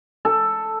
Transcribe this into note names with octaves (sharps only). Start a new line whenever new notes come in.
A4